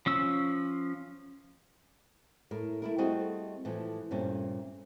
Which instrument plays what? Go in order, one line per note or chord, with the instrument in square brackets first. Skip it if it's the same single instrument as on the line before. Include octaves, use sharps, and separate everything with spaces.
[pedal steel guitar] F3 C#4 E6
[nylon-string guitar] A2 A#4
A3 E4 A#4
G3 A3 C4 F#4 G#4 D#5
A2 E3 F3
G2 A#2 A3 C4 C#4